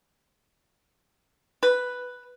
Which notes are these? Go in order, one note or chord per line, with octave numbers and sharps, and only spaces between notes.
B4